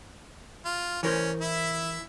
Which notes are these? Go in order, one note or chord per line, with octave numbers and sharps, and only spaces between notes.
F4
E3 C#4 A#4 C5
E4 E5